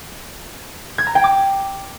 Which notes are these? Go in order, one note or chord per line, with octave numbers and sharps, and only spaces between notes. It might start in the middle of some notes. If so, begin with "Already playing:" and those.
G#6
A#5
G5
D6